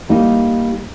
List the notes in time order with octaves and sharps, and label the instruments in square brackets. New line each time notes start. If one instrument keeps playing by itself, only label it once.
[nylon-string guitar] G3 A#3 D#4